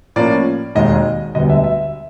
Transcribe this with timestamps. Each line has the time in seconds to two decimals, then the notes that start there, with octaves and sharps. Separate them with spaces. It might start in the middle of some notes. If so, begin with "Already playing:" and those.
0.16 A2 F3 A#3 C#4 D5
0.75 E1 D#2 D#3 G#3 D#5
1.35 E1 D2 D3 G3 B3 D#5
1.50 E5
1.64 E5